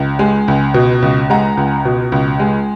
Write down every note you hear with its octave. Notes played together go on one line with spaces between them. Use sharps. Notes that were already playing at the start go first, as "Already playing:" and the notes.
Already playing: C#2
G#3
C#2
B2
C#2
G#3 F#5 A#5
C#2
B2
C#2
G#3